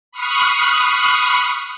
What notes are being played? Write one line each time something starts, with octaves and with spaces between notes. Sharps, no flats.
B5 C#6 D#6 F6 F#6 C7